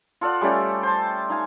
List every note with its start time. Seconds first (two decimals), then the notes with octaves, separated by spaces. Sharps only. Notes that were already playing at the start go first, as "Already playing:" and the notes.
0.21 F4 A4 D5 F#5
0.41 G3 A3 C#4 G4
0.83 C5 A5
1.29 D#4 F5 G#5